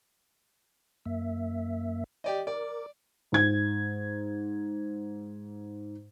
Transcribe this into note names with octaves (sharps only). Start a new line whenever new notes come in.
F#2 A#3 E5
G4 D5 D#5
A#4 D5 D6
G#2 G#6